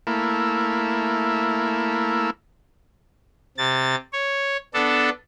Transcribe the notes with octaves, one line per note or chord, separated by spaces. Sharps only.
A3 A#3 E4
C3 A6
C#5
B3 D4 A4